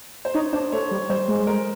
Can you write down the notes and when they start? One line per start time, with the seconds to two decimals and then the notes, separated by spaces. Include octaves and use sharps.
0.25 C5
0.34 D#4 C#5
0.53 D4 C5
0.72 A3 C#5
0.91 G3
1.09 G3 C5
1.28 G#3
1.47 A#4